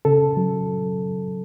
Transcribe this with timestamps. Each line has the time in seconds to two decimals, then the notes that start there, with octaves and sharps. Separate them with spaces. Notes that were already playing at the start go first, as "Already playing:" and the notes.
0.05 C#3 A4
0.37 F#3